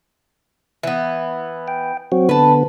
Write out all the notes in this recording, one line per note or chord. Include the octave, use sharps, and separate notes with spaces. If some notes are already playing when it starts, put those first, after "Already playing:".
E3 B3
G5
F#3 C4 F#4
D3 B3 B4 A5